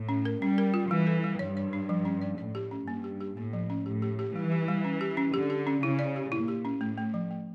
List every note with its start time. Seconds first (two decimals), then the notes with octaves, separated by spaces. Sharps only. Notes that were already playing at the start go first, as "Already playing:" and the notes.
Already playing: A2
0.09 C#4
0.25 A#4
0.41 G3 C#4
0.58 A#4
0.74 F4
0.91 E3 G3
1.07 A4
1.24 G3
1.39 G2 C#5
1.57 C#5
1.73 D4
1.89 F3
2.05 C#4
2.22 D5
2.38 A2 D5
2.55 G4
2.71 C#4
2.88 G2 A#3
3.04 G4
3.20 G4
3.37 A2 A#3
3.53 F3
3.70 C#4
3.86 A2 G4
4.02 G4
4.19 G4
4.35 E3 G3
4.52 G4
4.68 G3
4.84 C#4
5.01 G4
5.17 C#4
5.34 D3 G4
5.50 G4
5.67 C#4
5.82 C#3 E4
5.99 D5
6.16 G4
6.32 A#2 E4
6.48 G4
6.65 C#4
6.81 A2 A3
6.98 A3
7.14 F3
7.31 A3